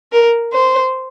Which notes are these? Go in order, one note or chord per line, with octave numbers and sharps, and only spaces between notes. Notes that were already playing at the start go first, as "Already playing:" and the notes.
A#4
C5